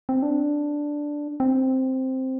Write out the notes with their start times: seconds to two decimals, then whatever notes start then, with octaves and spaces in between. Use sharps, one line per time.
0.09 C4
0.22 D4
1.40 C4